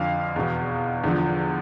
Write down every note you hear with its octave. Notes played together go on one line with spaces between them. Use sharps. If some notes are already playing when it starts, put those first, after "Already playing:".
Already playing: F2 D3 F3 F5
E2 B2
E2 D3 F3